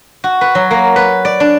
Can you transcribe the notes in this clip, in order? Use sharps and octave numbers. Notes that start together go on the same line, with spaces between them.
F#4
B4
F#3
A#3
B4
D5
D4